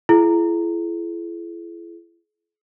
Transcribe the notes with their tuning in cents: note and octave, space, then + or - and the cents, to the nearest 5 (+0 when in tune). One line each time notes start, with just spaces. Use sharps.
E4 +40 G#4 +40